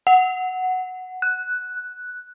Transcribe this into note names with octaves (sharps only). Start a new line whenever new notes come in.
F#5
F#6